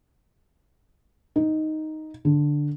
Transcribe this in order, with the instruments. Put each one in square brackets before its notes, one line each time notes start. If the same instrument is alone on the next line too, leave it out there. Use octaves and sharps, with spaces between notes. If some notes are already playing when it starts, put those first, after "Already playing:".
[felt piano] D#4
D3